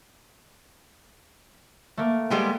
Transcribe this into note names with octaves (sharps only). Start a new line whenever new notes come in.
A3 A#3
G3 G#3 B3